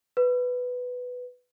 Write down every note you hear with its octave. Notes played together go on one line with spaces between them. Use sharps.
B4